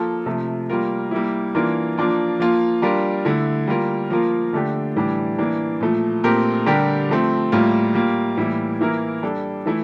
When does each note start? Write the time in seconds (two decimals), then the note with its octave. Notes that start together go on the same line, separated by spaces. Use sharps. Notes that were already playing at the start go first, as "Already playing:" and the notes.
Already playing: F3 A#3 F4 A4
0.26 C3 F3 A3
0.70 G3 A#3 F4 A#4
1.11 G3 A#3 E4
1.55 E3 A#3 D4 F4 A#4
1.98 F3 A#3 D4 F4
2.39 F3 A#3 F4
2.82 G3 D4 F4 A#4
3.25 D3 A3 E4
3.68 G3 A#3 F4 A#4
4.10 F3 A#3 F4 A#4
4.53 D3 A3 D4 G4
4.96 A2 E3 G3 D4
5.38 E3 A#3 D4
5.81 A#2 F3 A3
6.24 A#2 A3 C4 G4 A#4
6.66 D3 G3 D4 G4 A#4
7.09 F3 A3 C4
7.52 A2 G3 A#3 F4
7.95 G3 A#3 F4
8.37 A2 E3 G3 A#3 E4
8.81 E3 A#3 E4 A#4
9.23 G3 D4 A4
9.66 E3 A3 E4